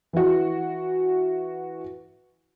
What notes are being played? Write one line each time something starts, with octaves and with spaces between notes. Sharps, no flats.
E3 F#4